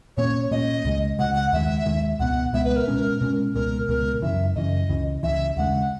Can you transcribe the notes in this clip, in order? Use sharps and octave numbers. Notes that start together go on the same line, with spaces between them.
A#2 A#3 C#4 C#5
A#2 A#3 C#4 D#5
C#2 C#3 G#3
C#2 C#3 G#3 F#5
F#5
D#2 D#3 G#3 E5
D#2 D#3 G#3
C#2 B2 G#3 B3 F#5
C#2 B2 G#3 B3 E5
B4
A#4
B2 G#3 C#4
B2 G#3 C#4
C#2 B2 G#3 A#4
C#2 B2 G#3 A#4
F#2 C#3 E3 E5
F#2 C#3 E3 D#5
C#2 C#3 E3
C#2 C#3 E3 E5
D#2 C#3 G#3 F#5